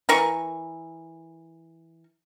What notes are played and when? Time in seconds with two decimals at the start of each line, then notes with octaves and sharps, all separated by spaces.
0.09 E3 A#4 C#6